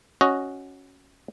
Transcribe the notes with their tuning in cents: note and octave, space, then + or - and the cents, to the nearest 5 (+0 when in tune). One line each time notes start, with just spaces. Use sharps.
C#4 +0 F#4 +0 D#5 +0